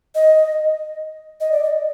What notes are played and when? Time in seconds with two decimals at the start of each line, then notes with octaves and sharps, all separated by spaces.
0.15 D#5
1.41 D#5
1.52 D5
1.64 D#5